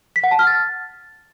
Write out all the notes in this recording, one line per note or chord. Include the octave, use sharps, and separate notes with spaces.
B6
F#5
A5
F6
A6